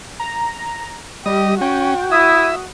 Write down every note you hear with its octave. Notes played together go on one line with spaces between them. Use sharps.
A#5
G3 G4 D#5
C#4 F#4 G5
E4 E5 D#6